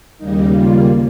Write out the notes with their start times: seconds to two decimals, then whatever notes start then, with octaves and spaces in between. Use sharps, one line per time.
0.18 D#2 C#3 G3 A#3 D#4
0.53 F4